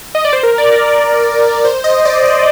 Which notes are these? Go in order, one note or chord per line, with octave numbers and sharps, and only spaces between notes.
D#5
D5
C5
A#4
D5
A#4
A#4
C5
D#5
D5
D5